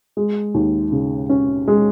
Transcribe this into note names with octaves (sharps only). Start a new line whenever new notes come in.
G#3
D#2
C#3
C#4
G#3